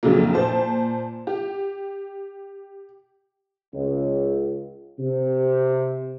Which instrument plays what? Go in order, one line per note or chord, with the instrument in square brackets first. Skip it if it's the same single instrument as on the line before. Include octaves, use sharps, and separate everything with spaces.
[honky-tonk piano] A#1 F2 C#3 F3 F#3 A#3
A#2 C5 A5
G4
[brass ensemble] C#2
C3